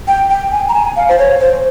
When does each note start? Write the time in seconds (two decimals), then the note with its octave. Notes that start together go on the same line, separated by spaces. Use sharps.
0.08 G5
0.30 G5
0.52 G#5
0.69 A#5
0.74 G#5
0.96 F5
1.09 C5
1.19 C#5
1.41 C5